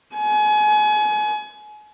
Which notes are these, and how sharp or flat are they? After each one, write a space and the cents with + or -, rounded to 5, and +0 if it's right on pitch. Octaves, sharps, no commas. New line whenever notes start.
G#5 +30